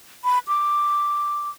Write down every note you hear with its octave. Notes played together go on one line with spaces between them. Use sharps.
B5
D6